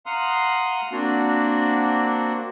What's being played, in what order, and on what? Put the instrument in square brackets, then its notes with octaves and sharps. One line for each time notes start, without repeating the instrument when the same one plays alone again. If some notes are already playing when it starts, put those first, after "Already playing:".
[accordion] F5 F#5 A#5 C6 D#6 F6
A#3 C4 D4 F#4